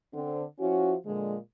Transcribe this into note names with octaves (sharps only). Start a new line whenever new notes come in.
D3 C4
F3 C#4 E4 F#4
A#2 D3 F3 G#3